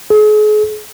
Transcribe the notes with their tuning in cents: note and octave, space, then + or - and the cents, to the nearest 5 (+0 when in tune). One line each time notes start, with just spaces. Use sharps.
G#4 +40